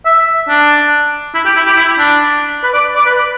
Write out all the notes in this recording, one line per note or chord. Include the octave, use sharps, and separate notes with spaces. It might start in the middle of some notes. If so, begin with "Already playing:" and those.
E5
D4
E4
G4
E4
G4
E4
D4
B4
D5
D5
B4